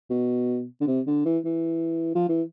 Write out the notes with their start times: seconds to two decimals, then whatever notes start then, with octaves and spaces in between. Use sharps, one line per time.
0.10 B2
0.81 D3
0.87 C3
1.07 D3
1.25 E3
1.45 E3
2.15 F3
2.29 E3